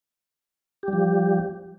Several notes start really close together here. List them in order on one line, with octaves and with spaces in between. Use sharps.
G4 G3 F3